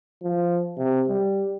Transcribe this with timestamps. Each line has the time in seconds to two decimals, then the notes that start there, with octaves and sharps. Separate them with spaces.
0.23 F3
0.78 C3
1.08 G3